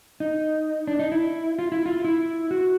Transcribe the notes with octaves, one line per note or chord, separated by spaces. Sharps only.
D#4
D4
D#4
E4
F4
E4
F4
E4
F#4